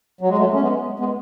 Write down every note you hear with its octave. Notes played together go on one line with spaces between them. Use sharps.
F#3
G#3
F#3 A3
C#4
G#3 B3
G#3 B3